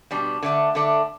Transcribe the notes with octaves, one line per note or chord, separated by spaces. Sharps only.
B2 G3 D4
D3 A3 D4
D3 A3 D4